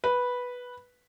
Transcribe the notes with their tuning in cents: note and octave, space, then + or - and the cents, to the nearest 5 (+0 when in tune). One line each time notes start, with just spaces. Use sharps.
B4 -5